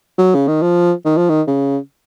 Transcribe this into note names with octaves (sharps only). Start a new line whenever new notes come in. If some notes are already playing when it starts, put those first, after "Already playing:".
F#3
C#3
D#3
F3
D#3
F3
D#3
C#3